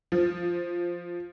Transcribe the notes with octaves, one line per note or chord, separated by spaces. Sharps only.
F3